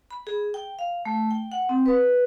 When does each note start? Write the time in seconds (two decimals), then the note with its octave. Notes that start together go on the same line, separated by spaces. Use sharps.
0.11 B5
0.27 G#4
0.54 G5
0.79 F5
1.05 A3
1.31 G5
1.52 F#5
1.69 C4
1.86 B4